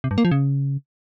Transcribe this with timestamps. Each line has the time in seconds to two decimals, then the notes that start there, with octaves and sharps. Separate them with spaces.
0.04 C3
0.11 G2
0.18 A#3
0.25 F3
0.31 C#3